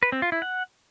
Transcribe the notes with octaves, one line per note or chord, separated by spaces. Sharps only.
B4
C4
F4
E4
F#5